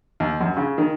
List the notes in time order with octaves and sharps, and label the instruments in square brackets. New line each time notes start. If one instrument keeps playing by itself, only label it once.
[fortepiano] D#2
F#2
C#3
D#3